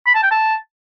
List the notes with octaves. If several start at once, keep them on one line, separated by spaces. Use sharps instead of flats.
B5
A5
G5
A5